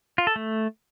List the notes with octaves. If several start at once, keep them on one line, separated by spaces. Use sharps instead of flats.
F4
A4
A3